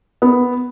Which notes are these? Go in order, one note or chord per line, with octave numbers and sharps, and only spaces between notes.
B3